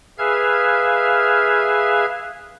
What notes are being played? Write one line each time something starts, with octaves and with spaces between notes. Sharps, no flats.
G#4 B4 E5 F5 F6 G#6